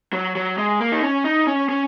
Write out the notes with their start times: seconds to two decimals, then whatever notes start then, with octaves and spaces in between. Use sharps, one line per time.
0.13 F#3
0.35 F#3
0.58 G#3
0.80 A#3
0.92 D#4
1.02 C#4
1.24 D#4
1.47 C#4
1.69 C#4